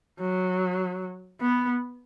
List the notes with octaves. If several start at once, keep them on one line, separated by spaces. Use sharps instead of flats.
F#3
B3